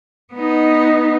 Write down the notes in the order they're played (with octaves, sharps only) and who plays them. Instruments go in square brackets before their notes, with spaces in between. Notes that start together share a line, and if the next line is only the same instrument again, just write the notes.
[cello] B3 D#4